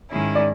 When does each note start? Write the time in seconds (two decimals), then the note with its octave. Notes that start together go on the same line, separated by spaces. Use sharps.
0.10 G#2 D#3 G#3 C#4 E4
0.35 D5